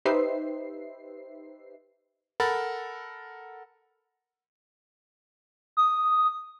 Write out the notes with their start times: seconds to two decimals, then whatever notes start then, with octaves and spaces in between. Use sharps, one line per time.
0.05 D#4 G4 B4 C5 E5 C7
2.40 A4 A#4 F#5 B5 A6
5.77 D#6